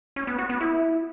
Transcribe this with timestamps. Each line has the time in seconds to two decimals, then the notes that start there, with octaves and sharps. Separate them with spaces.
0.16 C#4
0.27 B3
0.38 F#4
0.49 B3
0.61 E4